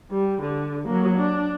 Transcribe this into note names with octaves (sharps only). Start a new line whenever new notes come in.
G3
D3
F#3 A#3
D4